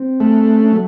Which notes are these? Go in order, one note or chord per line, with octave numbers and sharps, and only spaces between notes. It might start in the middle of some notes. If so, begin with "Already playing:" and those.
Already playing: C4
A3
C#4
F#3